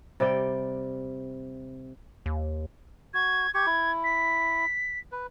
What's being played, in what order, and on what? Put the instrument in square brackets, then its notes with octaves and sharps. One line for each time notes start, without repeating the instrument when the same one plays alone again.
[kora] C3 G3 D5 G5
[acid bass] D#2
[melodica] F#4 [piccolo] G#6
[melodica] G4 C#6 [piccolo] G#6
[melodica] E4
[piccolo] B6
[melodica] B4